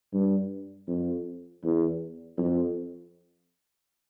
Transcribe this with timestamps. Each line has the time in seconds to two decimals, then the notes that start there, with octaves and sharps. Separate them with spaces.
0.13 G2
0.88 F2
1.64 E2
2.38 F2